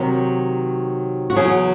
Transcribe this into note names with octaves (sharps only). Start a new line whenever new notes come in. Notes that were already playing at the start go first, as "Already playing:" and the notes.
Already playing: C3 D#3 F#3
F#4
E2 C#3 F#3 G#4